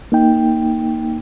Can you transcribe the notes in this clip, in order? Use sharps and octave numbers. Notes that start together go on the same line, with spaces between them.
A#3 D#4 G5